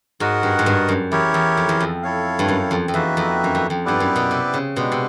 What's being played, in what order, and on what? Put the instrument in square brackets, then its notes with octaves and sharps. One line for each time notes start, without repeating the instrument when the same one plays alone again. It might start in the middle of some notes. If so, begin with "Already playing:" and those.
[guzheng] G#2 [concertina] F#4 A#4 D#5 F#5
[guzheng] G2
G#2
G2
F#2
[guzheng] E2 [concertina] E4 G4 A#4 C#5
[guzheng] E2
F2
E2
F2
[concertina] E4 A4 C#5 F5
[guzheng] G2
F#2
F2
F2
[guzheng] E2 [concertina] A#3 D#4 F#4 B4 E5
[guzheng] F2
F#2
F2
F2
[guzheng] G2 [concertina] B3 E4 G4 B4 D5
[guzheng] F#2
B2
C3
C#3
[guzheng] B2 [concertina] G#3 B3 D4 G4
[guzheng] C3